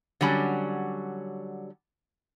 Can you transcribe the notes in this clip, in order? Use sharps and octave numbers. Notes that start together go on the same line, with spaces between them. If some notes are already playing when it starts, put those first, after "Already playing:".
D3 F#3 G3 C#4